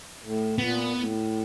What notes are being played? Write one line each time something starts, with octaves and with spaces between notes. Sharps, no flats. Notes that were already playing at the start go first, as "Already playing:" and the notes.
A2
A#2 B3
A2